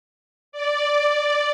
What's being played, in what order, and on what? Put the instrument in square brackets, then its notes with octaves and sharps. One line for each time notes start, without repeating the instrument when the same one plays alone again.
[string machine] D5